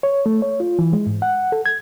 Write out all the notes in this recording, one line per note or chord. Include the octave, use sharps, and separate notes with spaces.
C#5
A3
C#5
F4
E3
G#3
G#2
F#5
A4
G#6